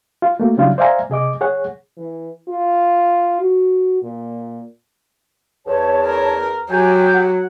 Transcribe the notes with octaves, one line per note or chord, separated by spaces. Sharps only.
F4
A3 A#3 F#4
C#3 F#3 G3 D4 E4 F4
C5 D5 E5 F5 G#5 A#5
C3 G#4 D#5 D6
G#4 C#5 F#5
E3
F4
F#4
A#2
E2 C#5 A5
A#4
F#3 G4 G#5 G6
F#5